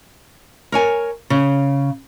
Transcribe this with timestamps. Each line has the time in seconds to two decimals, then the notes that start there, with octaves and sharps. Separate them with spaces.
0.72 A#4 C#5 G#5
1.30 C#3